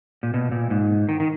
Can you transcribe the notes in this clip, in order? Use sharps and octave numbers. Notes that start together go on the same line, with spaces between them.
A#2
B2
A#2
G#2
D#3
D#3